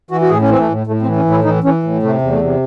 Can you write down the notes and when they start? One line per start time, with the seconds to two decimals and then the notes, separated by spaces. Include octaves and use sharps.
0.11 E3 F#4
0.21 F#4
0.29 A2 G#4
0.42 C#4
0.48 E3 C4
0.59 A3
0.68 A2
0.87 A2 A3
1.02 C4
1.06 E3
1.16 C#4
1.25 A2
1.31 E4
1.44 E3 D#4
1.64 E3 C#4
1.83 A2
2.02 C3 A3
2.21 E2
2.31 A3
2.41 C3